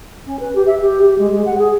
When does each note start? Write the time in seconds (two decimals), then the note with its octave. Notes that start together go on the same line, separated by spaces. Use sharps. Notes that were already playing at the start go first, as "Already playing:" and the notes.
0.26 C#4
0.39 B4
0.55 G4
0.66 E5
0.80 G4
1.01 G4
1.18 G#3
1.30 G#3
1.45 F#5
1.57 G#4